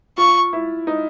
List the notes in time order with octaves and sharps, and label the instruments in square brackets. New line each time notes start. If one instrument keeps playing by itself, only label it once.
[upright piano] F4 [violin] C#6
[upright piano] E4
D#4